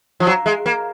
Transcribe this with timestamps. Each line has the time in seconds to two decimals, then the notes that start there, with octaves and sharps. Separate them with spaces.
0.20 F3
0.27 F#3
0.46 G#3
0.66 A#3